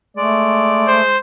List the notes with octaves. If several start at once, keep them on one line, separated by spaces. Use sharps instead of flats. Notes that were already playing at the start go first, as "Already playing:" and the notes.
G#3 A3 D5
C5